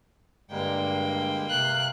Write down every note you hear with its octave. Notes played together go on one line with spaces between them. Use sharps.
G2 D3 G3 G#3 A#3 G5
C3 F5 F#6